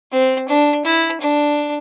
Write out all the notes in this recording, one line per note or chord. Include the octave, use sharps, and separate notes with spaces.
C4
D4
E4
D4